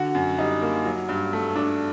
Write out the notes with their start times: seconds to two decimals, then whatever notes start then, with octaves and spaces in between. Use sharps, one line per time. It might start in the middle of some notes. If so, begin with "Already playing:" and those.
Already playing: D3 F#4
0.15 F#2
0.38 G3 D#4
0.62 A#3
0.85 F#3
1.09 G2
1.33 A3
1.56 D4